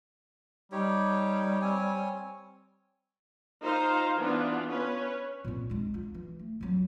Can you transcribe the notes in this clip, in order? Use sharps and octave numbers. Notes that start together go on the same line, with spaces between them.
G3 D#4 G4 C#5
C4 C#5 G#5
D#4 F4 C5 F5 A#5
E3 B3 D4 F4
C#4 B4 C#5
A#2 C4
G#3 D4
F4
E3
A3
F2 F#3